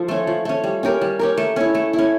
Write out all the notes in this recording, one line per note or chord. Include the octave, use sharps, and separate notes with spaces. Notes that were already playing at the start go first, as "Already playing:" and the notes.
Already playing: F3 A4
A3 C#4
F3
A3 C#4
G3
C#4 G4 A#4
G3
C#4 G4 A#4
A3
C#4 E4
A3
E4
C#4